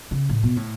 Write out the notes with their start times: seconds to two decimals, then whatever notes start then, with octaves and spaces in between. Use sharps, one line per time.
0.11 C#3
0.29 A2
0.43 B2
0.56 A2